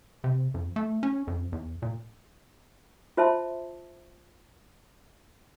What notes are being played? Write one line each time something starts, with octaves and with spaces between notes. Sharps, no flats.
C3
F2
A3
C#4
F2
E2
A#2
F4 C5 E5 A5 C6